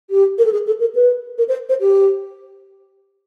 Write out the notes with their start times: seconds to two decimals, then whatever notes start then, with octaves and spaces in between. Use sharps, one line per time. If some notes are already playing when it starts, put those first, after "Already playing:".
0.10 G4
0.38 A#4
0.45 A4
0.53 G#4
0.67 A4
0.80 A#4
0.95 B4
1.38 A#4
1.48 C5
1.69 C5
1.80 G4